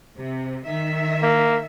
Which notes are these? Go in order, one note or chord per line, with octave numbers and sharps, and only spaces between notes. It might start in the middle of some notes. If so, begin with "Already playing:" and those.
C3
D#3 E5
A#3